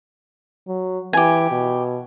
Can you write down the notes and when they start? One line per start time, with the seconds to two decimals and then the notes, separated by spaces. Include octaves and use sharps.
0.68 F#3
1.13 E3 G4 G#5
1.51 B2